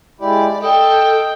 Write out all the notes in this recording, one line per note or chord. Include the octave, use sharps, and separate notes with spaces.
G#3 E4 G4 D5
A4 D#5 G5